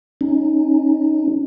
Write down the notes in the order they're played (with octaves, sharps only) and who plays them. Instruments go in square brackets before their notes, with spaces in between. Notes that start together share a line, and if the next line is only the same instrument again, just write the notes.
[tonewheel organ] C#4 D#4